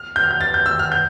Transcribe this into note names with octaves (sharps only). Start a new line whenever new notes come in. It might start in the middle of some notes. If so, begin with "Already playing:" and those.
Already playing: F6
G6
F6
G6
A6
G6
E6
F6
G6